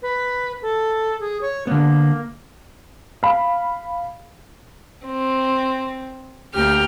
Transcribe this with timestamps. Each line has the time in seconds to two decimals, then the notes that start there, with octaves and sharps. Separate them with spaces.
0.02 B4
0.62 A4
1.20 G#4
1.41 C#5
1.67 D3 A#3 B3
3.23 F5 B5
5.06 C4
6.53 D2 A#3 G4 G5 F6